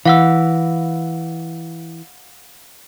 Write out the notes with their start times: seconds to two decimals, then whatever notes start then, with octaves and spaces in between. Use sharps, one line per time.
0.05 E3 F5 F#5 E6